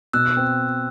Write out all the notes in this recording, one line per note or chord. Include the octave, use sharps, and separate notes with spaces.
B2 E6 F#6
C4